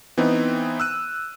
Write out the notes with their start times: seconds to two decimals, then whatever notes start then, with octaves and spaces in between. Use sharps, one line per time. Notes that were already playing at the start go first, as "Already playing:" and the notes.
0.18 E3 B3 C4 D#4
0.80 E6 F#6 D#7